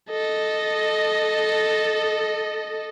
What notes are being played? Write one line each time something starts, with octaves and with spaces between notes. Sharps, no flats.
A4 D#5